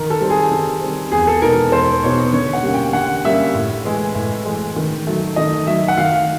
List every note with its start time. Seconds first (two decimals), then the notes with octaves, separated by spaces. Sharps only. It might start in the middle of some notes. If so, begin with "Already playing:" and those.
Already playing: D#3 A#4
0.10 A4
0.21 G3 C4
0.30 G#4
0.51 D#3
0.81 G3 C4
1.12 E2 G#4
1.27 A4
1.42 B2 G#3 B3 D#4 A#4
1.72 E2 C5
2.03 B2 G#3 B3 D#4 C#5
2.33 D3 C#5
2.53 F#5
2.63 G3 A#3 C#4
2.74 G5
2.93 D3 F#5
3.25 G3 A#3 C#4 E5
3.55 A2
3.85 E3 G#3
4.15 A2
4.45 E3 G#3
4.76 D#3
5.07 F#3 A3
5.36 D#3 D#5
5.67 F#3 A3 E5
5.88 F#5
5.98 D#3 F5